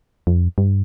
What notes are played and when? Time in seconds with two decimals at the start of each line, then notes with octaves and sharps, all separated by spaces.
0.27 F2
0.58 G2